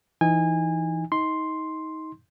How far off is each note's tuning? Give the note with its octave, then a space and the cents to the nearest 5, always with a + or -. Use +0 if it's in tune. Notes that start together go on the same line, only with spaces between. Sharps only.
E3 +15 D#4 +10 G#5 -25
D#4 +25 C6 +0